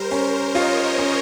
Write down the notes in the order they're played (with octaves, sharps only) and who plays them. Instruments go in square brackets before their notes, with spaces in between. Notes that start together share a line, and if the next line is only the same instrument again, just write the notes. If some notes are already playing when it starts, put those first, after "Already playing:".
Already playing: [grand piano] G3 [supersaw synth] A#4 C5
[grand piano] C#4 [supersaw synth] A#4 C5
[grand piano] F4 [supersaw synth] C#5 D#5
[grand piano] C#4